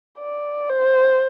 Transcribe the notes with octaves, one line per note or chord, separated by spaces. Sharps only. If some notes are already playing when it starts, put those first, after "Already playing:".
D5
C5